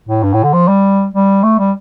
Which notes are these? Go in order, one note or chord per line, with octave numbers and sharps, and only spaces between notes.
A2
G2
A2
D3
F3
G3
G3
A3
G3